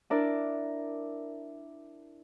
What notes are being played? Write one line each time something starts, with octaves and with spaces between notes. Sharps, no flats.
D4 E4 A#4 D5